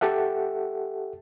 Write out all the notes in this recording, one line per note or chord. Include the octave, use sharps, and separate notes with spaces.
G4 A4 E5 F#5